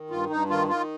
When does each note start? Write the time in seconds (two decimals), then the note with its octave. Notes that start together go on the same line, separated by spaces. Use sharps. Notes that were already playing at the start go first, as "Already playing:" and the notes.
Already playing: D#3
0.10 G2 F4
0.30 G2 D#4
0.49 D#3 F4
0.69 D#3 F4